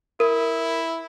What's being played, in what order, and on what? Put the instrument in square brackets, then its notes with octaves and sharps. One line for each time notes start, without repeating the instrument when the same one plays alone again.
[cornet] E4 [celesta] A#4